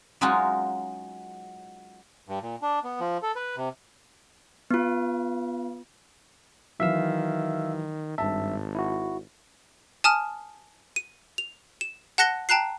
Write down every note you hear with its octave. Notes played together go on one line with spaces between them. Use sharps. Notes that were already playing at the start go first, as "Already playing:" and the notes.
F#3 G#3 C#4 D#4 F4 F#4
G2
A#2
D4
B3
F3
A4
B4
C3
B3 F4
D#3 E3 F#3 E5 F5 E6
G#1 G2 E5 A5
E4 F#4
G#5 A5 D#6 F6
D#7
F7
E7
F#5 A5 F#6 A#6 C#7 G7
G5 A5 A#5 F#6 C7